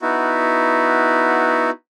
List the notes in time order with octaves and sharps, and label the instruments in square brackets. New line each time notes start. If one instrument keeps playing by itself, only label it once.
[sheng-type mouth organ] B3 D#4 E4 F#4